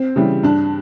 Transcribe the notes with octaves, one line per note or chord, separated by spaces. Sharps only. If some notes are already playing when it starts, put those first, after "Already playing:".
Already playing: C4
C#3 E3 G3
G2 D4